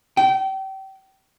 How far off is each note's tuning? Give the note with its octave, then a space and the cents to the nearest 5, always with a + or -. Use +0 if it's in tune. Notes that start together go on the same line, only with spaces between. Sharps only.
G5 -30